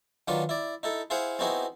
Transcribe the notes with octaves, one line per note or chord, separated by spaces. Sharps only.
D#3 F#3 D4 F4 B4
E4 D5
D#4 E4 A4
E4 G#4 C5 F5 F#5
B3 C4 D#4 E4 F#4 G#4